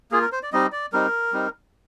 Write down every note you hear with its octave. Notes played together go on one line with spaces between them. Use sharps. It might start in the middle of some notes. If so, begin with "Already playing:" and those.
A#3 F4 G#4
A#4
C5
D5
G3 C4 D#4 D#5
D5
G3 C4 D#4 A#4
G3 C4 D#4